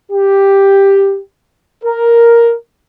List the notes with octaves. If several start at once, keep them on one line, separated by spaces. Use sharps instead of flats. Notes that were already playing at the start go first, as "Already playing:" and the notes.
G4
A#4